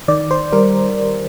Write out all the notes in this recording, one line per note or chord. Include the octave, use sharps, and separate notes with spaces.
D#3 D5
C5
G3 A#4